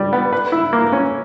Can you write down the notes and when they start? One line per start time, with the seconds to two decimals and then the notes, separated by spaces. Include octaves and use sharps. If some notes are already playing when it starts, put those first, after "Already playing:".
Already playing: G3
0.13 B3
0.33 B4
0.52 E4
0.73 A#3
0.93 C#4